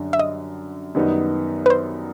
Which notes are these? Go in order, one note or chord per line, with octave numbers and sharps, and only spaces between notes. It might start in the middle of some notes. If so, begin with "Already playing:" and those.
Already playing: F#2 D3 G3
E5
D#5
F#2 D#3 G3 B3 D#4
B4
C5